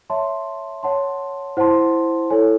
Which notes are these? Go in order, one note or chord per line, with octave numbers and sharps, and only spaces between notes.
C#5 E5 A5 C6
C#5 F#5 A5 C6
E4 C5 F#5 A5 C6
E4 A4 C#5 G#5